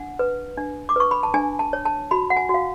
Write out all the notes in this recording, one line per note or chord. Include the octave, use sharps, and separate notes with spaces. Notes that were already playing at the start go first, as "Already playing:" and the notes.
Already playing: D4 F#5
B4
D4
D6
B4 C#6
B5
A5
D4 G#5
A5
C#5
A5
F#4 B5
F#5
G#5
F#4
F5